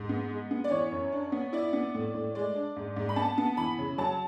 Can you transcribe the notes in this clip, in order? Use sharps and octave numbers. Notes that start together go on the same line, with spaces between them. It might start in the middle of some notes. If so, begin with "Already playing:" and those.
Already playing: G#2
B3
G#3
B3
D5
E3 C#5
F#2
D4
B3
E4 D5
B3
A2
A2
G#3 D5
D4
G#2
G#2
B5
B3 A5
B3
E3 B5
C#3
F#3 A5